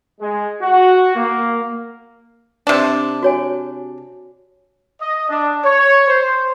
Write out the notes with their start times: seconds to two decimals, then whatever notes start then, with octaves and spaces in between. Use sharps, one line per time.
0.21 G#3
0.62 F#4
1.16 A#3
2.67 C3 D4
3.23 F#4 C#5 G#5
5.01 D#5
5.29 D4
5.63 C#5
6.08 C5